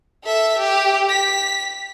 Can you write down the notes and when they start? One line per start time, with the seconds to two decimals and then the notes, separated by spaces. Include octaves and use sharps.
0.24 A4 E5
0.58 G4
1.09 B6